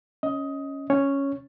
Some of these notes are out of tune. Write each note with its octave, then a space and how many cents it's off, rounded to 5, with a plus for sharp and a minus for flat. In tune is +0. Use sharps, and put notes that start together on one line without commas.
C#4 +0 D#5 +15
C#4 +0 C#5 +0